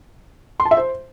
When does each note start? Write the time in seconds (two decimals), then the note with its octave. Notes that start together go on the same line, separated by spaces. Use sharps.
0.60 C6
0.65 A5
0.71 E5
0.77 C5